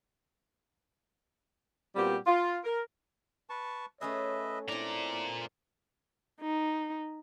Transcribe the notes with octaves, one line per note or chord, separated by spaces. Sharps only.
A#2 G3 B3 C4 F#4 G4
F4
A#4
B4 A5 C#6
A3 C#4 G#4 B4 C#5 D#5 E5
A#2 C4 D4 E4 A#5 D6
D#4